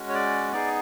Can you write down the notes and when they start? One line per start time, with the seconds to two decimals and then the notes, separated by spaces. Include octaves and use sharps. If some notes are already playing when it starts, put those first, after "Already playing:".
Already playing: G#3 C#4 F#4
0.09 C#5
0.14 D5
0.52 B3 D#4 G#4 D5